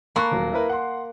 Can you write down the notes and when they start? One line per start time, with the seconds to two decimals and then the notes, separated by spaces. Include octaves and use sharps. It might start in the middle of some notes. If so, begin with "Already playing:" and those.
0.16 A#3 A5 B5 C#6 F#6
0.31 D#1 F#3
0.53 E4 A#4 B4
0.69 F#5 C6